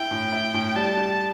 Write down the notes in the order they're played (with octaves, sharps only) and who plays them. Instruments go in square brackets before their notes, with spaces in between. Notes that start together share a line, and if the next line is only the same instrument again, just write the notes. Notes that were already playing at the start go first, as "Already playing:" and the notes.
Already playing: [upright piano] E4 [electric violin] G5
[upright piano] A2
E4
A2
[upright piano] G3 [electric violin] A5
[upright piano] G3